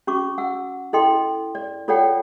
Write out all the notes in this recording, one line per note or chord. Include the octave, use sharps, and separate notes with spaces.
C#4 F#4 C#6 D6
F#5 E6
E4 A4 D#5 G5 C6
D5
F4 A4 C#5 D5 F#5 G5